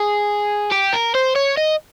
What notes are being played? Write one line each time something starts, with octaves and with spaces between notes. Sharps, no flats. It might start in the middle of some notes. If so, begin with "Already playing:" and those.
Already playing: G#4
G4
A#4
C5
C#5
D#5